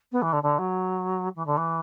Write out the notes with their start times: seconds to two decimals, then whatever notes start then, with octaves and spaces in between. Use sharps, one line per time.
0.12 B3
0.22 E3
0.32 D3
0.43 D3
0.58 F#3
1.35 E3
1.46 D3
1.57 E3